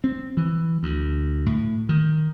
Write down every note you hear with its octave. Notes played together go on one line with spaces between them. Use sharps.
C4
E3
D2
A2
D#3